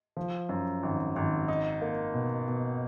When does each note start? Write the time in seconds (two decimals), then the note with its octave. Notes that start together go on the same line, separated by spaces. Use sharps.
0.17 F3
0.49 F#2
0.83 G#1
1.16 G#1
1.48 D#4
1.81 A#3
2.14 B2
2.48 B2